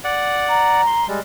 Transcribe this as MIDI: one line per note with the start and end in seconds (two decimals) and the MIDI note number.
0.04 0.81 74
0.04 0.81 78
0.49 1.05 82
0.86 1.07 84
1.08 1.20 55
1.08 1.20 56